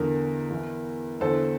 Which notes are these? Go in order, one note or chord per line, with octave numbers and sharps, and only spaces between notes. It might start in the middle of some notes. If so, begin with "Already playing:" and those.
Already playing: E2 D3 A#4
E2 E3
E2 D3 A4 C5